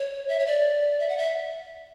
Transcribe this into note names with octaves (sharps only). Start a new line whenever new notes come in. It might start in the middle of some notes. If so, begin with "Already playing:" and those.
Already playing: C#5
E5
C#5
D5
E5
F#5
E5